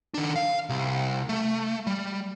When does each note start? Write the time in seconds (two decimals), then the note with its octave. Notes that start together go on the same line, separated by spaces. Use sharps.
0.14 D#3 D4
0.36 F5
0.69 C2
1.29 A3
1.87 G3